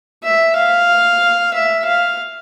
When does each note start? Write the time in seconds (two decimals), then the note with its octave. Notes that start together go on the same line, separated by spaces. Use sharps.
0.24 E5
0.56 F5
1.54 E5
1.85 F5